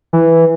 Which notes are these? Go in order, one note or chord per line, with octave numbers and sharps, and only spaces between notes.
E3